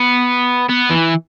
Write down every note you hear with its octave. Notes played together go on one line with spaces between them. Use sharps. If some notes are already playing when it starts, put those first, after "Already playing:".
Already playing: B3
B3
E3